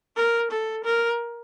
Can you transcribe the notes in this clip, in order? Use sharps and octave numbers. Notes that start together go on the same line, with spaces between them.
A#4
A4
A#4